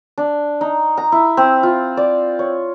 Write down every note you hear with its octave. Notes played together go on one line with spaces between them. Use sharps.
D4
D#4
A#5
E4
C4
F4
D5
C#5